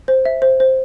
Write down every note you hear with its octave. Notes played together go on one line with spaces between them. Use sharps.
C5
E5
C5
C5